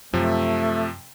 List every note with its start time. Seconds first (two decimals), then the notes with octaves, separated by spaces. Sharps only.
0.13 F#2 C3 F3 A3